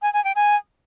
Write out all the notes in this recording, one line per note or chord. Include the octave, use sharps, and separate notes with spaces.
G#5
G#5
G5
G#5